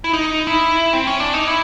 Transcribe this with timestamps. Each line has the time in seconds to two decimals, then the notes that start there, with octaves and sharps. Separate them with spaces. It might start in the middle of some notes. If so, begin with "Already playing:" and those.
0.04 E4
0.13 D#4
0.47 E4
0.93 C4
1.07 C#4
1.20 D4
1.34 D#4
1.48 E4